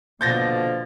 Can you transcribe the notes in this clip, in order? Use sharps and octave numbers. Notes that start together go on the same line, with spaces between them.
B2 D3 F3 A#3 G6 A6 A#6